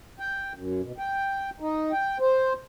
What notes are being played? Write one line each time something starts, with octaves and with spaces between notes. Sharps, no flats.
G5
F#2
B2
G5
D#4
G5
C5